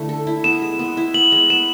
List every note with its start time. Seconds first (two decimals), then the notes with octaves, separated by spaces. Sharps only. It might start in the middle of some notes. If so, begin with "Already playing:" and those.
Already playing: D3 A3 E4
0.09 A4
0.27 E4
0.44 B3 E7
0.62 G#3
0.79 B3
0.97 E4
1.14 B3 F#7
1.32 G#3
1.50 B3 E7